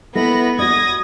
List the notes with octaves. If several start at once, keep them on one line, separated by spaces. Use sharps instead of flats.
B3 E4 A4 B5 A#6
F#4 D5 D#6 G#6 A#6